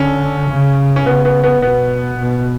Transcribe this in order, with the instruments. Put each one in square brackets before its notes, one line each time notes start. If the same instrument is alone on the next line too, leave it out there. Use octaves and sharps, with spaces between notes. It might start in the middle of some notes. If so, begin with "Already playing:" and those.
Already playing: [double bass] D3 [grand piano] C#4
[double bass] C#3
[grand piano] C#4
[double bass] C#3 [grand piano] B3
[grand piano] B3
B3
[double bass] B2 [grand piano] B3
[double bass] B2